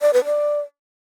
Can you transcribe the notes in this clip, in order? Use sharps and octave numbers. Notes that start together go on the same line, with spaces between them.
D5
B4
D5